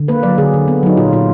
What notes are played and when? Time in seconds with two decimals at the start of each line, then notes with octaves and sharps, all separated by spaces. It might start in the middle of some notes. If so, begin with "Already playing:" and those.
Already playing: D3
0.08 A#3 B4
0.23 F#3 D5
0.38 D3 G#4
0.54 D3
0.68 B3
0.83 F#3 D#4
0.97 A#2 F4
1.13 A#2 F4